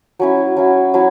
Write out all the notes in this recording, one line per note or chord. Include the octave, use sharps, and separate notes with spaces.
F#3 C#4 E4
F#3 C#4 E4
F#3 C#4 E4